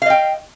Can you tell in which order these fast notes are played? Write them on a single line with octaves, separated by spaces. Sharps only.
F5 D#5 G5